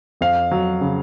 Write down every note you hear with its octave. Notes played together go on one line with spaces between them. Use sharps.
F2 F5
F#3
C#3